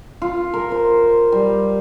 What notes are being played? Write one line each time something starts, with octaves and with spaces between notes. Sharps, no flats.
F4
A#4
C5
G3